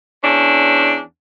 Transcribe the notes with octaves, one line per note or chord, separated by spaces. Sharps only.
E2 C#4 D4